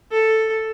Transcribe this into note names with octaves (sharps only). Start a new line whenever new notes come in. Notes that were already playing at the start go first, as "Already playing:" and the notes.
A4